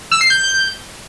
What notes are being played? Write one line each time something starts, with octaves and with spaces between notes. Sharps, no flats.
E6
C7
G6